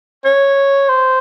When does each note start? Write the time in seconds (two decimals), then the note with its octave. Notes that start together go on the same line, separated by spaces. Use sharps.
0.25 C#5
0.89 C5